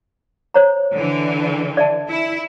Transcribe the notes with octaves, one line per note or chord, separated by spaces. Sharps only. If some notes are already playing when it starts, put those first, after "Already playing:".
C5 C#5 A#5
D3 E3
D5 E5 A5
E4